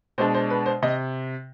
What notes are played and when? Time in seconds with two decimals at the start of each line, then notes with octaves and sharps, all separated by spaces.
0.18 B2 G#3 D4 C5
0.34 C5
0.50 B4
0.66 C5
0.83 C3 D#5